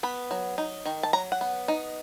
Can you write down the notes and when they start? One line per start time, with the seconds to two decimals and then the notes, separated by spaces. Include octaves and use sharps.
0.03 B3 B5
0.31 F#3
0.58 D#4
0.86 D#3
1.03 A5
1.13 F#3 A#5
1.32 F#5
1.41 B3
1.68 D#4